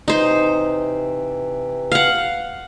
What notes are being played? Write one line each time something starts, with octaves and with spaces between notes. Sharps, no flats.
C3 E3 D#4 C5
F5 F#5